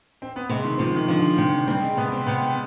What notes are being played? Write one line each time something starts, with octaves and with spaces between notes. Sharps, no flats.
C4
B3
C3 G#3
D#3
C3 F3
D#3
D3 F3
C3
G3 C4
G#3
C3 B3
C4
C3 B3